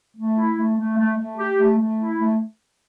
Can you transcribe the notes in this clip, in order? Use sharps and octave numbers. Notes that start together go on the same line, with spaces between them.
A3
E4
A3
A3
A3
A3
G4
A3
A3
E4
A3